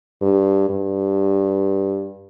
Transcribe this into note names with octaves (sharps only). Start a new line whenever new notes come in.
G2
G2